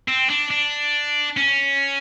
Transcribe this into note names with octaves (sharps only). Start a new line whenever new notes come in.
C4
D4
D4
C#4